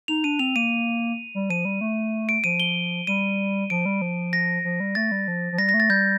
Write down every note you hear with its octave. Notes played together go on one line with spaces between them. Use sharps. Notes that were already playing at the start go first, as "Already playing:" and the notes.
D#4 F7
D4 D#7
C4 F7
A#3 D#7
G3
F3 D#7
G3
A3
D7
F3 D#7
G7
G3 D#7
F3 D7
G3
F3
A#6
F3
G3
A3 A6
G3
F3
F3
G3 A#6
A#6
A3
A6
G3 G6